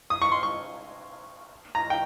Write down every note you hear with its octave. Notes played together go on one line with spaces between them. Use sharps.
D#6
C#6
C6
C#6
A#5
G5